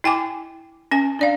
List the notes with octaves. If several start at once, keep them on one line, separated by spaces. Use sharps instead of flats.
E4 G5 G#5 D6
C#4 G#5
D4 D5 F5